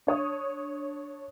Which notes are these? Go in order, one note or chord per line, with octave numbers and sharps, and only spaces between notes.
D4 C#5 D#6